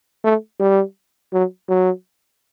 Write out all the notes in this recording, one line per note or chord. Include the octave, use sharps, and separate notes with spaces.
A3
G3
F#3
F#3